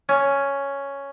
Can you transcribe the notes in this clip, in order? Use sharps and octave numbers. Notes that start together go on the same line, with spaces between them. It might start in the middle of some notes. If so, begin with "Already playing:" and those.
C#4